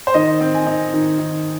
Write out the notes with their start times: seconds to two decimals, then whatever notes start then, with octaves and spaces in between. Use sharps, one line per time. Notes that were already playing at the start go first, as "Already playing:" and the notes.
0.07 C5
0.14 D#3 D#5
0.41 C4
0.55 G#5
0.66 D#4
0.94 D#3
1.19 D#3